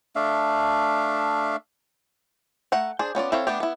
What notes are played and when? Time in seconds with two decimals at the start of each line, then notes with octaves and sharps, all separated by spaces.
0.16 A3 D4 E5 F5
2.72 A3 F#5 A#5
2.99 D4 G#4 C5
3.15 B3 C#4 F4 D5
3.32 C4 E4 A4 C#5 F5
3.47 A3 B3 D4 G4
3.60 B3 E4